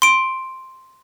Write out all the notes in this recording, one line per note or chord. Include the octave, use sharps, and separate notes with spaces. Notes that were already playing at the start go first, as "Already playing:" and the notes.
C6 D7